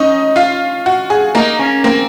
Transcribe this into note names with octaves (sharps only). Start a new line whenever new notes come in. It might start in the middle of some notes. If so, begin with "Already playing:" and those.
Already playing: C#4 D#4 D#5
F4 F5
F#4
G#4
A#3 D#4 A#4
C#4
A#3 C4 A#4